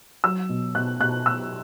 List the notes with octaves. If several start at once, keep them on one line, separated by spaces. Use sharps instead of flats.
F#3 E6
B2
B2 F#6
B2 F#6
B2 E6